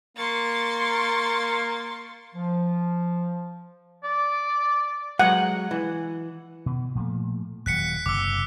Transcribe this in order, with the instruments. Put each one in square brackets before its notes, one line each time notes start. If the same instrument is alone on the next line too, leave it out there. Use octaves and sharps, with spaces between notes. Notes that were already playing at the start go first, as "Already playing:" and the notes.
[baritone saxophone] A#3 [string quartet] C6 C#6 A6
[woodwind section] F3
[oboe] D5
[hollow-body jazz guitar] F#3 G#3 [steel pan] F#5
[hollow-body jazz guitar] E3
[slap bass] B2
A#2 F3 A3
[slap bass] D#1 F#3 [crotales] F#6 B6 C#7
[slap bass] F#1 C3 [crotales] D6 E6